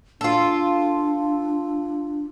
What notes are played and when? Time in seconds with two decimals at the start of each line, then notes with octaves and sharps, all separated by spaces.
0.21 D4 F4 A4